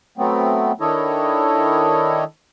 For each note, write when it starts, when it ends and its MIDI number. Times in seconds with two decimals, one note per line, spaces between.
0.18 0.72 54
0.18 0.72 57
0.18 0.72 59
0.18 0.72 60
0.80 2.24 51
0.80 2.24 62
0.80 2.24 64
0.80 2.24 69
0.80 2.24 73
0.80 2.24 75